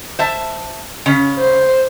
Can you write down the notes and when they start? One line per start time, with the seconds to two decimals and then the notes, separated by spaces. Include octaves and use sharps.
0.19 C5 E5 A5
1.06 C#3 C#4
1.39 C5